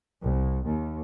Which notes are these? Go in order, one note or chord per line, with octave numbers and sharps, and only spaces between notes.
C2
D#2